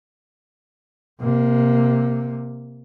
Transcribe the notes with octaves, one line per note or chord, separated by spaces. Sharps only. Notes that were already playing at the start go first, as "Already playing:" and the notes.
C3 A#3